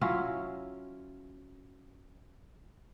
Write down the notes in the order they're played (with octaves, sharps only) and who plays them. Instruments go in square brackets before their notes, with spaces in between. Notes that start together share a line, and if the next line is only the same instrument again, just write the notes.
[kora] F#3 C#4 E4 F4